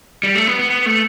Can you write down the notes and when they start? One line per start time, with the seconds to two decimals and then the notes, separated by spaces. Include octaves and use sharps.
0.23 G3
0.35 A3
0.47 B3
0.59 B3
0.70 B3
0.86 A3